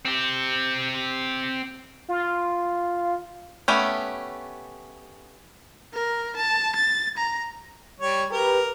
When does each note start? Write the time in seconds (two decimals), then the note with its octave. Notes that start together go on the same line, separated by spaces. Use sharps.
0.05 C4 G4
2.08 F4
3.68 A3 B3 C#4 G4
5.93 A#4
6.36 A5
6.76 A6
7.17 A#5
8.00 G3 C#5
8.31 G4 A#4 B4